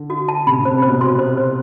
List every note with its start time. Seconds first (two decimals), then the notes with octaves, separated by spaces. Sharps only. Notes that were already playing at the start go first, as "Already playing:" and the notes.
Already playing: D3
0.10 F#4
0.28 A5
0.47 C3 B5
0.60 C3
0.65 C5
0.73 C3
0.82 C5
0.87 B2
1.00 C3 C6
1.19 C5
1.37 C5